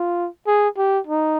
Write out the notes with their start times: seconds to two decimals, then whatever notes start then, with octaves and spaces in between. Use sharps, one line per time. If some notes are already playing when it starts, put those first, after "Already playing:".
Already playing: F4
0.47 G#4
0.77 G4
1.07 D#4